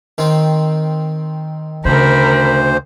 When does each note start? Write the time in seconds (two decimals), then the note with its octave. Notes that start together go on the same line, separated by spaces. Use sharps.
0.18 D#3 C4
1.85 D2 C#3 A#4 C5 B5